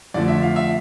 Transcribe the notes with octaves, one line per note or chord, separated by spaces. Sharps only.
F2 D3 F3 A3 D5
E5
F5
E5